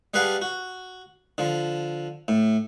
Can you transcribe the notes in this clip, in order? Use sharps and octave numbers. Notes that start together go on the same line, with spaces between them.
G3 G#4 B4 F5 F#5 A5
F#4
D3 F3
A2